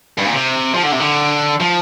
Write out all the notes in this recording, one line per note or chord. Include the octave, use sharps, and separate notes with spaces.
G2
A#2
C3
F3
D3
C3
D3
F3